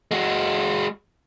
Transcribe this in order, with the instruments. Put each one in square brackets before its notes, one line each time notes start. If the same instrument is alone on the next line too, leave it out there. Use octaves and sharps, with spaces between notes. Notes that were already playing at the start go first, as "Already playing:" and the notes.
[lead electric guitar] G#3 F#4